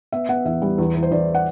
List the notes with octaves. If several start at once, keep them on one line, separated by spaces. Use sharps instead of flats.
B3 E5
B3 F#5
E2 E5
G3
E2
E2
C5
E2 D5
F#5